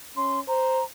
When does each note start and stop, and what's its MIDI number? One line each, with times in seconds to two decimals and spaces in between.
0.17 0.40 61
0.17 0.40 84
0.48 0.81 72
0.48 0.84 82